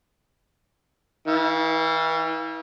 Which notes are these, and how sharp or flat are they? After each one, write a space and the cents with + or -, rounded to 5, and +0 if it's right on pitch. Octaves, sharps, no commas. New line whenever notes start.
E3 -35 F5 +0 E6 +40